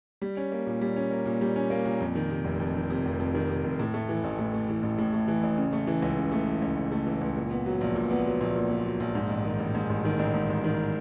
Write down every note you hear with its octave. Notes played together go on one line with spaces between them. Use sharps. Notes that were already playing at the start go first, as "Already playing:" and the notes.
G3
C#4
A#3
A#2
G3
C#4
A#3
A#2
G3
C#4
A#3
A#2
F2
D#3
C3
F1
F2
D#3
C3
F1
F2
D#3
C3
F1
A2
A3
E3
A1
A2
A3
E3
A1
A2
A3
E3
A1
C#3
A3
E3
C#2
C#3
A3
E3
C#2
C#3
A3
E3
C#2
A#2
B3
F#3
A#1
A#2
B3
F#3
A#1
A#2
B3
F#3
A#1
G#2
A1
D#3
A1
G#2
A1
D#3
A1
G#2
A1
D#3